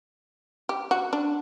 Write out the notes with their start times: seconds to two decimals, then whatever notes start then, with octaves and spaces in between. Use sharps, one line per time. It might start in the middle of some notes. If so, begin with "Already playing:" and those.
0.69 G4
0.91 F#4
1.13 D4